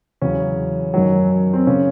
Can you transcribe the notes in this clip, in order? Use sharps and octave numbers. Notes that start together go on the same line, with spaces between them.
E2 C#3 F#3 C#4
F#2 D#3 F#3
C4
C#3 C#4